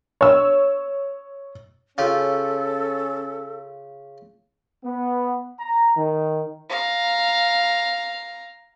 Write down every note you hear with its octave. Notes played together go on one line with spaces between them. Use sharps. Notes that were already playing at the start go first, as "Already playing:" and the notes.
C#5 E6
C#3 C#4 F4 G4 A4
B3
A#5
D#3
F5 A#5